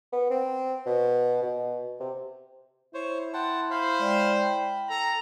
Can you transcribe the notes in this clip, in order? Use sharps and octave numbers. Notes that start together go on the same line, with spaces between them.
B3
C4
B2
B2
C3
E4 C5 C#5
F#5 G5 A5 C6
C5 F5 B5
G#3 D5 G5
G5 B5
A4 A#5